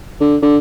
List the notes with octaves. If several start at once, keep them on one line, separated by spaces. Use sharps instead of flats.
D3
D3